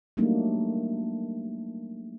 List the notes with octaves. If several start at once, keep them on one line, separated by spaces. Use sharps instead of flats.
F#3 G3 A3 A#3 D4 D#4